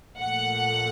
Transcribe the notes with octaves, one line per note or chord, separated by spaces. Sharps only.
A#2 F3 A3 F#5